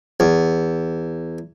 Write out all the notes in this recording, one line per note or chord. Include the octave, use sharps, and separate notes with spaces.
E2